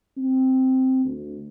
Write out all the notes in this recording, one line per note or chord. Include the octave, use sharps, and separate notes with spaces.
C4
D2